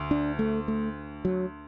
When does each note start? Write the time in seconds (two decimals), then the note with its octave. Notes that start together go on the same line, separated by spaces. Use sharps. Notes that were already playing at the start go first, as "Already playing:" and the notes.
Already playing: D2
0.11 D4
0.39 A3
0.68 A3
1.25 F#3